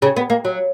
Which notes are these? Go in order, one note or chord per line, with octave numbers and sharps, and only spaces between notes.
C#3
B3
A#3
F#3